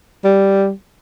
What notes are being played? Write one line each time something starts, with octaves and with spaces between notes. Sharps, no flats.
G3